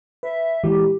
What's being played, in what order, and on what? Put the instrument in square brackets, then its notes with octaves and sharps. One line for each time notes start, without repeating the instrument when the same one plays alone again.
[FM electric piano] B4 [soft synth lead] E5
[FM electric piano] A#2 E3 G#3 [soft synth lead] G4